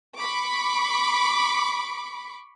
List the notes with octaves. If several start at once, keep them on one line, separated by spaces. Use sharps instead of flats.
B5 C#6 D6